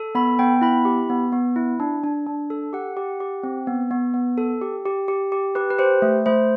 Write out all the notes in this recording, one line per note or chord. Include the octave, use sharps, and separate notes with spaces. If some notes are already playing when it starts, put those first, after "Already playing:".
Already playing: A4
B3 B5
B3 G5
E4 B5
G4
B3
B3
E4
D4
D4
D4
A4
G4 F#5
G4
G4
C4
B3
B3
B3
A4
G4
G4
G4
G4
G4 B4
B4
G4 C5
A3
A3 C5